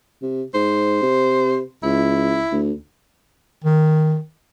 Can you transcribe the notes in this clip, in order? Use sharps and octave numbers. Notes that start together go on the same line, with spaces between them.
C3
G#2 C5
C3
C#2 E4
D2
D#3